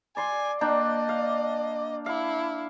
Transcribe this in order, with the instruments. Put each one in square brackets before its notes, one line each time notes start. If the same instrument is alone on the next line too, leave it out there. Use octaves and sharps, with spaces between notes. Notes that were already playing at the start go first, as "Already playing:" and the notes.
[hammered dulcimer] D5 C6 [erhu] G#5
[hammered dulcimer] A#3 D4 G5 [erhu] D#5
[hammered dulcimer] F5
[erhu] E4 [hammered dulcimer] F5